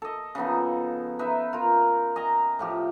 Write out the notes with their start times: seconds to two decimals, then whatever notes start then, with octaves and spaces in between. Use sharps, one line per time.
0.02 A4 D#5
0.35 C#3 F3 B3 D#4
1.19 D#4 B4 E5
1.53 F4 A#4
2.16 D#5 G#5 A#5
2.59 A2 F3 G4